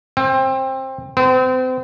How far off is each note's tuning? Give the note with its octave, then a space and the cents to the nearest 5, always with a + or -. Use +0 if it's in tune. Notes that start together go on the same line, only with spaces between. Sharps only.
C4 +20
C4 -35